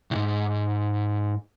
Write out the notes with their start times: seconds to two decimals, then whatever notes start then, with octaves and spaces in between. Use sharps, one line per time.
0.11 C2 G#2